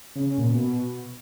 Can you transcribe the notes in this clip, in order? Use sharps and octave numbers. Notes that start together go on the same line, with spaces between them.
C#3
C#3
A#2
B2